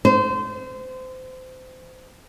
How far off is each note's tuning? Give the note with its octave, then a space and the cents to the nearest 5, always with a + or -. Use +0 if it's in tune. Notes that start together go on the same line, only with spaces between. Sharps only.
C5 -25